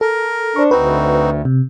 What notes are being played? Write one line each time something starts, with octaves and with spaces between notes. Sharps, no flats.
A4 A#4
D4 C5 C#6
D2 C4 D#4 F#4 B4
C3